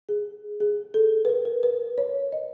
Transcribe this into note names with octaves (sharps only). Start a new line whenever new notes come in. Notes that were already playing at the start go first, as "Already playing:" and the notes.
G#4
G#4
A4
B4
A#4
A#4
B4
C#5
D#5